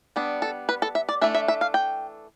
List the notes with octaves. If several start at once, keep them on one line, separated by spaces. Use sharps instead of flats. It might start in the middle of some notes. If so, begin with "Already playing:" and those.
G3 B3 D4
A4
B4
A4
E5
D5
E3 A3 D4 E5
E5
E5
F5
G5